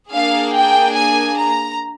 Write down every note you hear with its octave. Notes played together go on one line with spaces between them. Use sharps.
A#3 D4 G#4 F5
G5
G#5
A#5